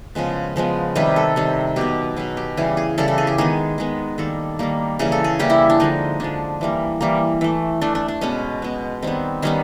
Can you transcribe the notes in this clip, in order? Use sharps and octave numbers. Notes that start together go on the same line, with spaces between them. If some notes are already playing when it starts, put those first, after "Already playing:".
C#3 F3 G#3 B3
C#3 F3 G#3 B3
C3 D#3 G3 B4
A4
C3 D#3 G3
B2 F#3 B3 G4
B2 F#3 B3 G#4
G4
C#3 E3 G3 G#4
G#4
C#3 E3 G3 A4
A4
G#4
G4
D#3 G#3 B3 G#4
D#3 G#3 B3
D#3 G3 A#3 A4
D#3 G3 A#3
C#3 E3 G3 A#3 G#4
A4
G#4
C#3 E3 G3 A#3 G4
E4
D4
D3 F3 G#3 D#4
D3 F3 G#3 D4
E3 G3 A#3
E3 G3 A#3
E3 A3
E3 A3 D4
D4
D4
B2 G#3 B3 C#4
B2 G#3 B3
D#3 G3 B3 C4
D#3 G3 B3 C#4